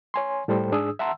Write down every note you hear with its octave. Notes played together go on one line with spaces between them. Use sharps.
C#5 G#5 C6
A2 G3 A4 C5 G5
G#2 D4 G#4 D#6 E6
E5 F#5 A5 A#5 C6 E6